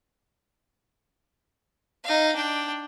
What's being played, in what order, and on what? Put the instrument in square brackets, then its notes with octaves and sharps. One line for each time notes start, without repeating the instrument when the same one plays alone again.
[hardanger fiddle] D#4 F5
D4 G5